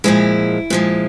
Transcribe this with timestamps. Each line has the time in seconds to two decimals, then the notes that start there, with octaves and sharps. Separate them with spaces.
0.04 A#2 F3 G#3 E4
0.70 A#2 F3 G#3